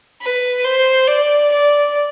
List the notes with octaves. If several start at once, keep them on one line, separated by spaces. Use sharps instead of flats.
B4
C5
D5
D5